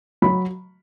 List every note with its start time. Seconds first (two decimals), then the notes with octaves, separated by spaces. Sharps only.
0.22 F#3 B5